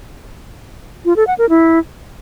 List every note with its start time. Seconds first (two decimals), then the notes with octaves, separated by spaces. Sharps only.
1.05 F4
1.16 A4
1.27 F#5
1.38 A#4
1.49 E4